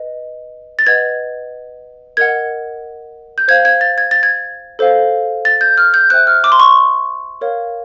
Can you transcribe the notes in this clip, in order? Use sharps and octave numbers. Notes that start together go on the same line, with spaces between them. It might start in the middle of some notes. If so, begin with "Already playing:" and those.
Already playing: B4 D#5
A6
B4 D#5 F#5 G#6
A#4 D#5 F#5 G#6
G6
C5 F5 G#6
G#6
A6
G#6
A6
G#6
A4 C5 F5
A6
G6
F6
G6
C5 E5 G5 F#6
F6
D6
C6
C#6
A#4 C#5 F5